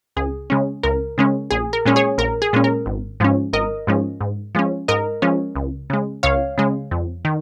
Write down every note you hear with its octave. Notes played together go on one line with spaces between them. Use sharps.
C#2 G#4
C#3 G#3 C#4
C#2 A#4
C#3 G#3 C#4
A#1 G#4
A#4
A#2 G#3 C#4
G#4 C#5
A#1 A#4
G#4
A#2 G#3 C#4
A#4
G#1
G#2 F3 G#3 C#4
G#1 A#4 D#5
G#2 F3 G#3 C#4
G#2
F3 G#3 C#4
G#2 A#4 D#5
F3 G#3 C#4
C#2
C#3 G#3
C#2 C#5 F5
C#3 G#3
F2
D#3